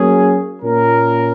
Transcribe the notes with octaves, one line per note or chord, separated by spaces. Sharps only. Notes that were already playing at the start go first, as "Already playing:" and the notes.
Already playing: F#3 A#3 C#4 G#4
A#2 A#3 C#4 A#4